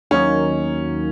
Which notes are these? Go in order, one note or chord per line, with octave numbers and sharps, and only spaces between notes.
D#2 D#3 F#3 A#3 C#4 D#4